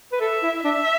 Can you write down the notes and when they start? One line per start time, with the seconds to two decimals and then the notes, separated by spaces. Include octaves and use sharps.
0.12 B4
0.20 A4 E5
0.43 E4
0.64 D4 E5